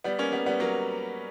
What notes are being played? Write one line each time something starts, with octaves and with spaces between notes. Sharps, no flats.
G3 B3
A#3 C#4
G3 B3
G3 B3
F#3 A#3